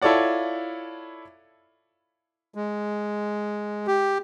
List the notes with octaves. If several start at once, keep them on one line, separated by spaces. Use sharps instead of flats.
E4 F4 A4 C#5 D5 F#5
G#3
G4